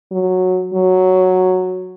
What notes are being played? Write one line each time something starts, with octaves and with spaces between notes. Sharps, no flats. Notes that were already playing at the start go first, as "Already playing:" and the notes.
F#3
F#3